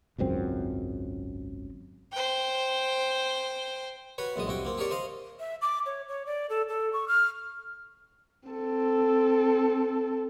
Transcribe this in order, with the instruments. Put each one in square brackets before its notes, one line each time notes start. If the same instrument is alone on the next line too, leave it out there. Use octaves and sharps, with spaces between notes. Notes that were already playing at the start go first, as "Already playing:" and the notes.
[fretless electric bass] G#1 C#2 F#2 C4
[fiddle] C5 G5
[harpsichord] F#4 B4 C#5
A#1 F#2 G#3 D#6
C2 F2 F#4 G5
A#3 C4
G4 G#4 A#4 C#5 D5
C5 D#5 F5
[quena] E5
D6
C#5
C#5
D5
A4
A4
C#6
F6
[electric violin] C4 A4